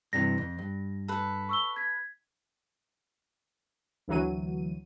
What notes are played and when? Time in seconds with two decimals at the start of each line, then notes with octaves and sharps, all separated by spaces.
0.13 G2 C3 E3 A#6
0.38 F2
0.58 G2
1.08 A4 B4
1.49 C#6 E6 G7
1.76 G#6 B6
4.08 D2 E3 F#3 D#7